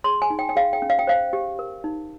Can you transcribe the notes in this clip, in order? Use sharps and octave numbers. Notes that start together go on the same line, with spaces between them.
G#4 C6
G#5
D#4
G5
G5
G#4 F5
G5
C#4
F5
G5
C5 F5
G4
A#4
D#4